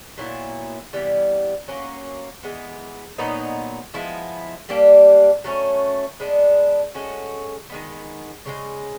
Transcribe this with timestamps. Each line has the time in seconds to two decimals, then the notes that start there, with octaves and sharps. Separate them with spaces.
0.18 A#2 F#3 B3 E4
0.93 C3 E3 G3 B3
1.68 F#3 A#3 C#4
2.43 E3 G#3 B3
3.18 A#2 F#3 B3 D#4
3.94 F3 G#3 B3 E4
4.69 G3 A#3 D4 G4
5.44 F#3 A3 C#4
6.20 G#3 B3 D4
6.95 G#3 C#4 F#4 A4
7.70 D#3 G#3 B3
8.46 C#3 E3 G#3